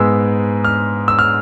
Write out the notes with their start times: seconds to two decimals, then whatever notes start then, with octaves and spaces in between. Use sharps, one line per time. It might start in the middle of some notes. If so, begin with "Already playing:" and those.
Already playing: G#2 G#3 B3 E6
0.65 F6
1.08 E6
1.19 F6